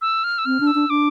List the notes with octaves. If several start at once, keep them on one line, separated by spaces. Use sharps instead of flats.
E6
F6
E6
C4 F6
D4
E6
D4
D4 D6